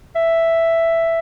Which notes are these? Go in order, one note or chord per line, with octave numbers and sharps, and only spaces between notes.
E5